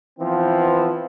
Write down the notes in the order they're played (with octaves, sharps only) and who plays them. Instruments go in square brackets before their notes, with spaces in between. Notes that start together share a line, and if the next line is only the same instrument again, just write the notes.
[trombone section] E3 F3 B3 C4